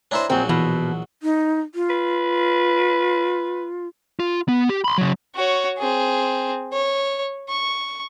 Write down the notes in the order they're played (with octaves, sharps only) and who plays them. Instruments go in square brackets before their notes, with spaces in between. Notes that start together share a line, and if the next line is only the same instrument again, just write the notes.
[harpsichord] D4 E4 C5 [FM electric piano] C#5 G#5 A#5
[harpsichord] A#1 F#3 [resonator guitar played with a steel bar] C4
[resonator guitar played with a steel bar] B2 [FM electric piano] E3
[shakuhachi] D#4
F4
[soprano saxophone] B4
[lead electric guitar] F4
B3
G4
B5 C6
C#3 F#3
[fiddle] F#4 C#5
C4 G#4
C#5
C#6